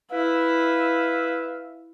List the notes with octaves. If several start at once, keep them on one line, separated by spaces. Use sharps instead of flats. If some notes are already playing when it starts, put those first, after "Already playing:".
E4 B4 E5 F5